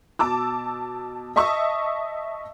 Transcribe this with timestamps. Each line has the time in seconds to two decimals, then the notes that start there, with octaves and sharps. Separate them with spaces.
0.19 B2 A5 D6 E6
1.36 D#5 E5 A5 C#6 D#6 E6